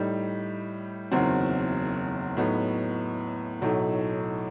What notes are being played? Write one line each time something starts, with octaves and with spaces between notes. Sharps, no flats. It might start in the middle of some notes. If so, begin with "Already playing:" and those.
Already playing: A2 G3 D#4
F#1 E2 D#3 F#3 C4
A2 F#3 B3 D#4
B1 A2 F#3 A3 D#4